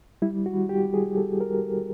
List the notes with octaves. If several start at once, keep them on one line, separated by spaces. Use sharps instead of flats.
G3 E4
F#4
G3
G4
G3
G#4
G3 A4
A#4